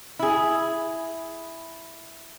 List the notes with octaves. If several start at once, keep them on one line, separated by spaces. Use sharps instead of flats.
E4 G#4